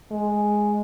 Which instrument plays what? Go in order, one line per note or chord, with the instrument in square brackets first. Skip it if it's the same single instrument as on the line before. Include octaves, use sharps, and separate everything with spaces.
[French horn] G#3